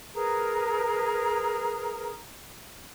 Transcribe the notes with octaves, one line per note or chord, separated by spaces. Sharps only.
G#4 A#4 B4 A#5